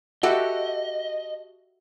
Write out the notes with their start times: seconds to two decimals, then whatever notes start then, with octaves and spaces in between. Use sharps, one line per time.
0.23 F#4 G4 A4 D#5 E5 F#5